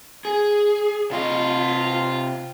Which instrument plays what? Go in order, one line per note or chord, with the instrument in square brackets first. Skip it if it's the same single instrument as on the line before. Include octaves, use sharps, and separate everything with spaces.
[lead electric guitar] G#4
[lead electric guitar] C3 D#5 [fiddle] F4